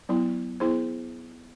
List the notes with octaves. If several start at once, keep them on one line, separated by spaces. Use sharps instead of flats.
F#3 B3 E4
B3 E4 G#4 C5